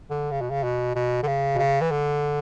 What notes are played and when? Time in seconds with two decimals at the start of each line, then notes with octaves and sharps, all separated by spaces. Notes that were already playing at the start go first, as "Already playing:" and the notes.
0.10 D3
0.31 C#3
0.41 B2
0.51 C#3
0.63 B2
0.96 B2
1.23 D3
1.27 C#3
1.55 B2
1.59 C#3
1.81 E3
1.91 D3